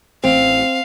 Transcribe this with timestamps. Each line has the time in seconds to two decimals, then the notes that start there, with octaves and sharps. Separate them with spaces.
0.24 A1 C4 F5